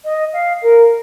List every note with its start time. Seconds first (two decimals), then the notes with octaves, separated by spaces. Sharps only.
0.04 D#5
0.33 F5
0.62 A#4